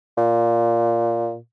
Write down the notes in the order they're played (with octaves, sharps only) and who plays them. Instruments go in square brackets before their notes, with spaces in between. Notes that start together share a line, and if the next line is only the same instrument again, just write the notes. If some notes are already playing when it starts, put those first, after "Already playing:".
[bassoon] A#2